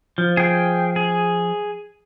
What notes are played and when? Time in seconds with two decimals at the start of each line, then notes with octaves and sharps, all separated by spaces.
0.18 F3
0.37 G#4 G5
0.96 G#4